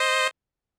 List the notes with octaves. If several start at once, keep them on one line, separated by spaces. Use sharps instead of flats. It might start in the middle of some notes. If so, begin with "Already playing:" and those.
Already playing: C5 D#5